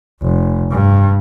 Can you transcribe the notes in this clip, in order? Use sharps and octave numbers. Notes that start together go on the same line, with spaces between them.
F1
G2